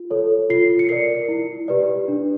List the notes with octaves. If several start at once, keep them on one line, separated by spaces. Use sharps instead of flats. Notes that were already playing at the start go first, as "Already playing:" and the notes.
Already playing: F4
A4 C#5
F4 C7
C#7
A#4 D5 C7
E4
G4 B4 D5
D4